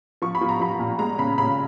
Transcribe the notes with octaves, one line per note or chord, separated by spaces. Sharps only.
F3 C#6
B5
F3
A#5
F3 B5
A#2
G#3 A#5
C#3 B5
C#3 B5